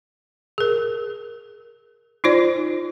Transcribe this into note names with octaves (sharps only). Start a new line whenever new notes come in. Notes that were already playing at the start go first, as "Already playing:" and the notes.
G#4 A#4
D#4 F4 C5 D5